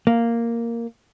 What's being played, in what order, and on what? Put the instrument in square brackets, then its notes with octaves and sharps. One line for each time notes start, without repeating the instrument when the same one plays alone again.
[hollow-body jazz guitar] A#3